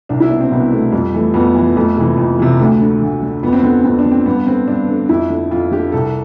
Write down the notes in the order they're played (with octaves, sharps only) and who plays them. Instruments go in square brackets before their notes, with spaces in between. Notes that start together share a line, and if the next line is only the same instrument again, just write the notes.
[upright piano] C2 D4
E4
B2 D4
C4
C2 B3
B2 A3
F2 G3
E3 A3
F2 B3
E3
F2 A3
C3 E3
F2
C3 E3
D2 A3
D3
D2
D3
F2 B3
C4
D3 B3
F2 C4
D4
D3
C4
G2 B3
D3 C4
G2 D4
D3
F2 E4
D3
F2 F4
D3 G4
C2 A4